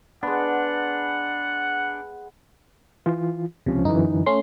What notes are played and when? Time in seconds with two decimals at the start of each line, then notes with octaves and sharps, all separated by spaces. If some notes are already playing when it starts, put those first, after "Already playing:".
0.23 G#3 B3 D4 F#5
3.06 E3 F4
3.66 C#2 C3 F3 C#4
3.85 F#2 D3 E3 D#4
4.26 A3 C#4 C6